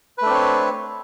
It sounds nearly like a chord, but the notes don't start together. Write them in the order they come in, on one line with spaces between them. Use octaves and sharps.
B4 A3 D4 C4 C#5